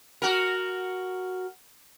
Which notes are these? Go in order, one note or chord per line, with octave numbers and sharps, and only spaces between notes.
F#4 A#4